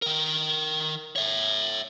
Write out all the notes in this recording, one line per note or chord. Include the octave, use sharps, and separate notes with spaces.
D#3 A#4
C#5 E5